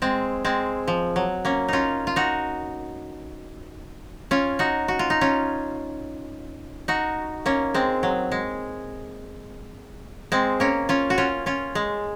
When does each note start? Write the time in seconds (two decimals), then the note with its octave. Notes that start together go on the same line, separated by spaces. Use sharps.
0.02 G#3 C4
0.45 G#3 C4
0.88 F3
1.16 F#3
1.45 A#3 C#4
1.68 C#4 D#4 F4
2.07 F4
2.16 D#4 F#4
4.31 C#4 F4
4.59 D#4 F#4
4.88 F#4
4.99 F4
5.10 D#4
5.21 C#4 F4
6.88 D#4 F#4
7.46 A#3 C#4
7.74 G#3 C4
8.03 F#3
8.31 G#3
10.32 G#3 C4
10.60 A#3 C#4
10.89 C#4 F4
11.10 F#4
11.18 C#4 F4
11.46 C#4 F4
11.75 G#3